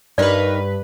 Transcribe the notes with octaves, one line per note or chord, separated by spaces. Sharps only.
G2 D#4 A#4 B4 C#5 D5